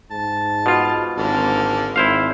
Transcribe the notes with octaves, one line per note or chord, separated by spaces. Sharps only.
G#2 A5
B2 F4
G#1 D3 A#3 A5
G#1 E4 C5 F5